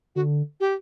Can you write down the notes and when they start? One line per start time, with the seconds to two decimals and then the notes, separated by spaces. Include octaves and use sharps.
0.16 D3 F#4
0.60 G4